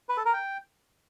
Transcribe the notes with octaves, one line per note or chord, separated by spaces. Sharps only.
B4
A4
A#4
G5